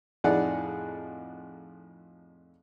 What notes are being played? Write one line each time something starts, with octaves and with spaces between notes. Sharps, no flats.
F2 A2 D#4 G#4 D5 F#5